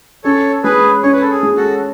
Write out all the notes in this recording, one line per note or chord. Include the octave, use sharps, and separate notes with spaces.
C#4 A4 C#5
G#3 G#4 B4
C#4 C#5
B4
A4
G#4
G#3
F#4 A4